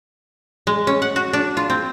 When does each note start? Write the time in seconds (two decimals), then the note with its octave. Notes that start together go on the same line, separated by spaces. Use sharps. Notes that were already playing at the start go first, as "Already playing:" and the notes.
0.67 G#3
0.87 C#4
1.02 F#5
1.16 F#4
1.33 D4
1.57 F4
1.70 C4